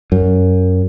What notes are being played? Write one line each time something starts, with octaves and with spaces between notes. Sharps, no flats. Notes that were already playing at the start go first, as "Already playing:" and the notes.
F#2